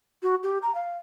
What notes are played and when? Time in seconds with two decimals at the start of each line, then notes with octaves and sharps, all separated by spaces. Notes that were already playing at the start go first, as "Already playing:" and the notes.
0.23 F#4
0.43 G4
0.62 A#5
0.75 F5